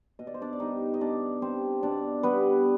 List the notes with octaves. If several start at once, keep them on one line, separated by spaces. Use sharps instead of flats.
B2 D#5
D5
C5
D4 D5
D5
G3 D#4 D#5
D#5
B2 D4 D5
G3 C4 C5
B2 D4 D5
G3 B3 B4